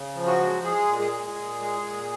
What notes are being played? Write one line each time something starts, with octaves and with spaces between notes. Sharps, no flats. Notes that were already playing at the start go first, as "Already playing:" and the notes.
Already playing: C#3
F3
F#3 F#4
G#3
G#3 G#4
A#2
G#3 G#4
G#3
A#2
G#3
A#2